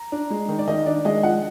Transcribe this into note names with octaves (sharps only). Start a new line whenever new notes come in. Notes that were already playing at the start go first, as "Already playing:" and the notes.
Already playing: A#5
D4
G#3
D#3
D5
D#3 D#5
D4 D5
G#3 D#5
F3 F#5